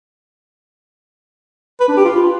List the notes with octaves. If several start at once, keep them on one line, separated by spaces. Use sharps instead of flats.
B4
D4
G4
F4